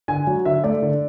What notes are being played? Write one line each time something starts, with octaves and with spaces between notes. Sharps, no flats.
D3 G#5
F#3
D3 E5
A3 D5
D3